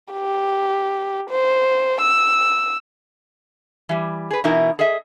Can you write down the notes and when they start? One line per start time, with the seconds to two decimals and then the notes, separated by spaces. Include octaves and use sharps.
0.13 G4
1.30 C5
2.01 E6
3.89 E3 G3
4.30 G#4 B4
4.44 B2 E3 D#4 E4 A#4
4.79 G#4 A4 D#5 E5